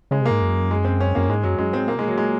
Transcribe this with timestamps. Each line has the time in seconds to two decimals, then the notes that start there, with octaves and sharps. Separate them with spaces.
0.11 C#3 G#3
0.21 C3
0.26 A#3
0.31 G#2
0.41 F#2
0.71 G#3
0.84 C4
1.00 C#4
1.15 F#2 A#3
1.29 G#2 G#3
1.43 F#2 F#3
1.58 F#2 G#3
1.73 G#2 C4
1.88 A#2 A#3
1.96 C3
1.99 G#3
2.04 A#2 F#3
2.18 G#3